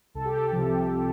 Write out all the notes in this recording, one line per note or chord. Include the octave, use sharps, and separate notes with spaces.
C2 A4
G4
A4
C3 F3